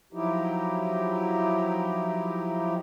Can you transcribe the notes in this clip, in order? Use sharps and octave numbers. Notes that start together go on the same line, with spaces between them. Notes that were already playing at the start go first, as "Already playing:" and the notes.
F3 F#3 D#4 E4 G4